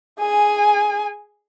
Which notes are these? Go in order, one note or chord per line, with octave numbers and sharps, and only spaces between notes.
G#4 G#5